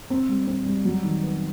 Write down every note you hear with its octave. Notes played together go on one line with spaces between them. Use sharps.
C4
G3
C4
G3
F#3
D#3
B3